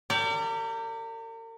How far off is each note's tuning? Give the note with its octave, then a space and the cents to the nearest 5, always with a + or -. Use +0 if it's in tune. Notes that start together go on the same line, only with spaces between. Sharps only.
G4 +0 A#4 -40 D5 -25